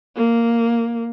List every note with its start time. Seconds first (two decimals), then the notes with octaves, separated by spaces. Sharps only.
0.16 A#3